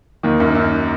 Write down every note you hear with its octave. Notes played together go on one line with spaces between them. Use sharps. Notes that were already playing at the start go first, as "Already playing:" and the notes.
D#2 D#3
F#2
F#2